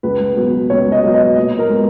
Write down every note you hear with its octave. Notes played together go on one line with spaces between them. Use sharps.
C#2 B4
B2 F#3 B3
C#2 C#5
D#5
B2 F#3 B3
D#5
A#2 D#5
A#4
G#3 B3